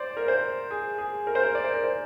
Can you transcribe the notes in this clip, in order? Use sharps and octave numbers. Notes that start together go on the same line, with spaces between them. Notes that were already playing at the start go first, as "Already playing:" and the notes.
Already playing: C5 D5
A#4
C5
G#4
G#4
A#4
C5
A#4
D5
C5
A#4
C5